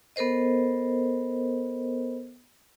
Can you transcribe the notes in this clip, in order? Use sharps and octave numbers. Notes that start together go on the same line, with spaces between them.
B3 A4 A#4 C5 D#5